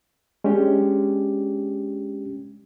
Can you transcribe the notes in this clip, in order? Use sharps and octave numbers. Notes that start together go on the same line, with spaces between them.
G#3 C#4 D4 G4